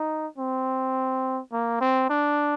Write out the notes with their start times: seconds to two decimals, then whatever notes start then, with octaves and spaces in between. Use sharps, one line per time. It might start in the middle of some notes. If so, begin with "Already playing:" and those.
Already playing: D#4
0.38 C4
1.52 A#3
1.81 C4
2.09 D4